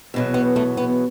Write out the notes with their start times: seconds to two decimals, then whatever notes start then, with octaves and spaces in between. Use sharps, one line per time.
0.14 E2 B2 F#3
0.34 B3
0.56 A3
0.77 B3